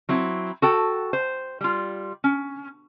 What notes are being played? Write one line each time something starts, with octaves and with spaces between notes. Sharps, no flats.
F#3 C4 E4
F#4 A4 G5
C5
G3 F4
C#4